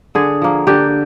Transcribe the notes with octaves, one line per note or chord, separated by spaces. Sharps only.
D3 G#4
F3 A#3
D3 G4